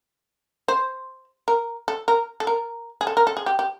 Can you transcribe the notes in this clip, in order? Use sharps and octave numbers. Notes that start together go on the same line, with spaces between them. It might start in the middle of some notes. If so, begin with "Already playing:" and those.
C5
A#4
A4
A#4
A4
A#4
G#4
A4
A#4
A4
G#4
G4
G4